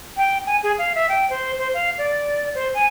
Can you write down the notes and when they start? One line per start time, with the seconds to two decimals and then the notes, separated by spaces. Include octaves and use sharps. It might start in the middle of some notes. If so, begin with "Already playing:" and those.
0.17 G5
0.46 G#5
0.63 G#4
0.78 F5
0.95 E5
1.09 G5
1.30 C5
1.58 C5
1.74 F5
1.98 D5
2.54 C5
2.74 G#5